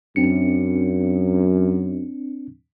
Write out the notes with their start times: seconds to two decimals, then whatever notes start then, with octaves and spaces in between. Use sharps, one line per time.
0.16 F#2 C4 D4 C#7